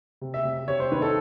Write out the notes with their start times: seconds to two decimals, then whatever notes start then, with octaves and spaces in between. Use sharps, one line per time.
0.22 C3
0.34 E5
0.45 C3
0.68 C3 C#5
0.80 C5
0.92 D#3 B4
1.02 A4